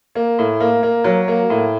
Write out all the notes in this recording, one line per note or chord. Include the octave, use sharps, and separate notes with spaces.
A#3
A2
A#3
A#3
F#3
A#3
A2